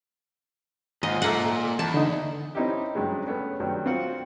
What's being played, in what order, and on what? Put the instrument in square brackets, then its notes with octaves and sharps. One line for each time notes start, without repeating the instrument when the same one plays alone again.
[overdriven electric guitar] D#2 [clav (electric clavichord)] G#2 F4 [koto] D#5
[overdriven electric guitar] A#2 [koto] A3 A#3 F#5
[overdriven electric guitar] E2 [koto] A5
[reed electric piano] D3 D#4
[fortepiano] C4 C#4 D#4 E4 G4
G2 C#3 F#3 G#3
A3 B3 C#4
G2 D#3 F#3 G3
C4 F4 F#4 F#5